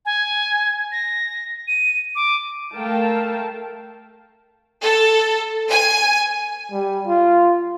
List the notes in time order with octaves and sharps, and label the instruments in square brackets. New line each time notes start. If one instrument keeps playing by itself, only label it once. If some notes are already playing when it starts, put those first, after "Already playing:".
[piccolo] G#5
A#6
D#7
D6
[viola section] A3 A4 A#4 F5 G5 A5
[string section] A4
G#5
[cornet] G3
F4